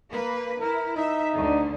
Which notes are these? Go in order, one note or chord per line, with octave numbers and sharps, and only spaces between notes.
A#3 B4
E4 A#4
D#4 E5
D2 D3